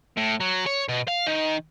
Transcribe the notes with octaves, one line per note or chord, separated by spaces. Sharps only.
A2
F#3
C#5
B2
F5
D#3